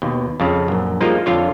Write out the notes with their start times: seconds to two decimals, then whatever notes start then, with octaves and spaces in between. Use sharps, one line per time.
0.02 D#2 B2
0.40 F2 C#3
0.68 A#1 F#2
1.01 F3 G3 G#3 A#3 D#4 F4
1.26 F2 D3 F4 C#5